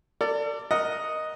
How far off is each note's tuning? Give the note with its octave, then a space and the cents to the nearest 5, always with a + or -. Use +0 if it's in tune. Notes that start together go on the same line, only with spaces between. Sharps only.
A4 +40 D5 -5
A#4 +10 D#5 +0 F#5 +0